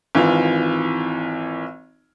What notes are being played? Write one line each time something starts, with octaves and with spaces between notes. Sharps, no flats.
G#1 E3 F4